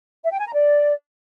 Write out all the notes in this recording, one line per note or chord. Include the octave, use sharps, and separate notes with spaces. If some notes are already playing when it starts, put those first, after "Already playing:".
E5
G5
G#5
A#5
D5